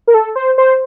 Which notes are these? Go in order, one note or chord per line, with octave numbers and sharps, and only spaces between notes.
A#4
A4
C5
C5